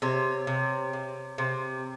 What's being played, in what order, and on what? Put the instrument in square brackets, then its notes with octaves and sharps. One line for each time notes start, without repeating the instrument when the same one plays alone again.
[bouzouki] C3 C#5
C3
C3
C3